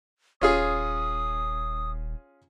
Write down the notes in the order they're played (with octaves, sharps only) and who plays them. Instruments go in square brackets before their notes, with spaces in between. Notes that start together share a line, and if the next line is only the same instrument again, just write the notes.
[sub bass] D#1 [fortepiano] C#4 F4 G#4 [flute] D#6